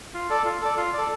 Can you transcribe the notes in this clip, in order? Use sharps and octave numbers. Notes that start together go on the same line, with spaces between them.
F4
A4 D5
F4
A4 D5
F4
A4 D5